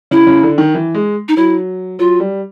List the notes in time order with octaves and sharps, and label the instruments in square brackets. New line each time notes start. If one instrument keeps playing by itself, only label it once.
[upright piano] C#3 [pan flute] E4
[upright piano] C#3
D3
D#3
E3
G#3
[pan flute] D#4
[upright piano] F#3 [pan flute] E4
[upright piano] F#3 [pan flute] F4
[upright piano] G3